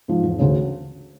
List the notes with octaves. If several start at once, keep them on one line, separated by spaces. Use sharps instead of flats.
G#2 F3
E1
D2 C#3